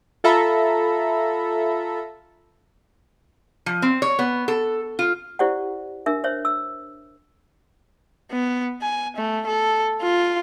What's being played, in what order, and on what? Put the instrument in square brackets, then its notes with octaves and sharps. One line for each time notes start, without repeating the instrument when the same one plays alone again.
[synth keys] F4 A4 E5 A#5 B5
[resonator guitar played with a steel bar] F3
C4
C#5
B3
A4
F4
[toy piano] E4 G4 C5 D5 F#5
D4 A#4 E5
C5 C#5 E5
E6
[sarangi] B3
G#5
A3
A4
F4